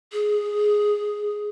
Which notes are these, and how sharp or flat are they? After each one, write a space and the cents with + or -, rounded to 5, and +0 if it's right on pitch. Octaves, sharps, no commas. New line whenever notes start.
G#4 +0